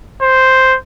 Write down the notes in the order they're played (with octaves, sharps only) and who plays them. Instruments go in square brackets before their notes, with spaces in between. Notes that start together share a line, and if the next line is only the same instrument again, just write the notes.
[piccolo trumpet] C5